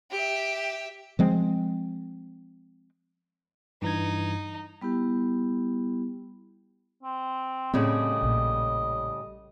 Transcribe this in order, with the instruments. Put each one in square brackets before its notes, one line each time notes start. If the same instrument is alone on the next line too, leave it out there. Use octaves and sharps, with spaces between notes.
[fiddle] G4 E5
[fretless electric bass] F3 G#3 C4
[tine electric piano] G2 E3 G#6 [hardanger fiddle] D#4
[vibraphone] G3 B3 E4 G4
[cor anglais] C4
[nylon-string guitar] A2 C#3 G3 [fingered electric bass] C4 [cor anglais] D#5
[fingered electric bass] A#1 A#2